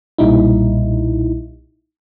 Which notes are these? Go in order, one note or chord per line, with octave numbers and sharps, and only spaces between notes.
B1 A#2 G3 D#4 E4